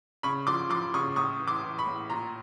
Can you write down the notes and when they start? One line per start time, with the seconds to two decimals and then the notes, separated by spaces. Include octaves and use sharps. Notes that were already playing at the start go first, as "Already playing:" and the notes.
0.23 C#3 B5 C#6
0.47 F3 C6 D6
0.70 F3 C6 D6
0.94 C#3 C#6 D#6
1.16 A2 C#6 D#6
1.40 E3
1.48 C6 D6
1.64 E3
1.78 B5 C#6
1.86 A2
2.10 A#2 A#5 C6